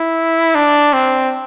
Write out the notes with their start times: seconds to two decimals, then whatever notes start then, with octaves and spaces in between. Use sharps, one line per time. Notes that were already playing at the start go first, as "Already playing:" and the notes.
Already playing: E4
0.55 D4
0.93 C4